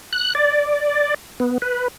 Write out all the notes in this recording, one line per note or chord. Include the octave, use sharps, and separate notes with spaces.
F#6
D5
B3
B4